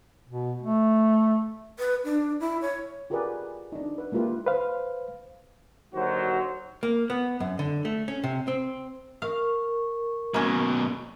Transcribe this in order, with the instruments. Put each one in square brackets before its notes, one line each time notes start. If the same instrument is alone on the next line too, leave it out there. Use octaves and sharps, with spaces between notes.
[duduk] B2
A3
[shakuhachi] B4
D4
E4
C#5
[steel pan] F4 G4 G#4 A#4 B4 D5
D4 D#4
B4
G#3 A#3 E4 F4 G4 B4
[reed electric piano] B4 C5 F5
[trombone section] D#2 D3 F#3 F#4 C5
[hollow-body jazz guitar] A#3
B3
F#2
D3
A3
C#4
C3
C4
[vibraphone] A#4 C#6 [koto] F5
[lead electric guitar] F#2 B2 [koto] A#3 C#4